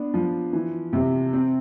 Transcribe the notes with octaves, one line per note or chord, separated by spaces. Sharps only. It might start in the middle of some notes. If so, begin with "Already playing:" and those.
Already playing: B3 D4
F3
E3
C3
C4